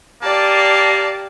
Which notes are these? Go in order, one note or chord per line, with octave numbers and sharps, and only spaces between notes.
A#3 G4 D5 A5